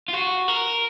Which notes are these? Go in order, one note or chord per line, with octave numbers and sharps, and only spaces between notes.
F4
F#4
A#4